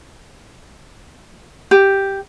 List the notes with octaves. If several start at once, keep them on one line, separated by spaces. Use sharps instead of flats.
G4